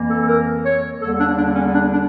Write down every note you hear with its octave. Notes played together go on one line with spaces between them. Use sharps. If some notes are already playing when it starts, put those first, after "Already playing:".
Already playing: F2 E3 A#3
A4
A4
A#4
C#5
E2 D3 G3 A#3 A4
D4
D4
C#4
D4
D4